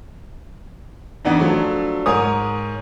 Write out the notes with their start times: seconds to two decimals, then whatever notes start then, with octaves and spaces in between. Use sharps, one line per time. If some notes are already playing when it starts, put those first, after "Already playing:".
1.25 F2 E3 B3 D4 D#4
1.39 F3 F#3 A3 D4
2.06 G#2 A#4 C#5 G#5 D#6